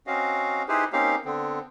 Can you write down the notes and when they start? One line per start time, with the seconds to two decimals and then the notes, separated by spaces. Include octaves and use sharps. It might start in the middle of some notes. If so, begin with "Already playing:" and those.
0.07 C4 C#4 F#4 D#5 F5
0.68 D#4 E4 G4 G#4 B4 C5
0.93 A#3 C4 C#4 D#4 G4 F5
1.25 D3 B3 C4